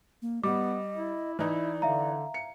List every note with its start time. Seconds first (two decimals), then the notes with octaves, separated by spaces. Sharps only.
0.22 A#3
0.44 G3 B3 D#5 D6
0.96 E4
1.39 E3 D#4 E4 D5
1.82 D3 E5 F5 A#5
2.34 C#7